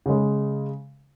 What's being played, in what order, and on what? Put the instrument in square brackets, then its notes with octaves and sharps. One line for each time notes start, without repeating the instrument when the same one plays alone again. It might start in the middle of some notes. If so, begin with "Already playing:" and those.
[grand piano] C#3 G#3